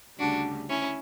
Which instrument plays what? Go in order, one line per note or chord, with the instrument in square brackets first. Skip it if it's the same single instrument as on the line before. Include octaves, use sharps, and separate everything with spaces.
[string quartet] D2 C#3 G3 D4 F#4
C#4 E4